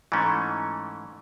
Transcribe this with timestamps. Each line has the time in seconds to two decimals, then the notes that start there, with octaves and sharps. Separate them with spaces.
0.12 G#2 E3 A3 C#4